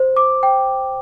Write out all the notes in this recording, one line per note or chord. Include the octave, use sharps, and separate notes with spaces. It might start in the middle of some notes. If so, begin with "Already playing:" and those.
Already playing: C5
D6
G5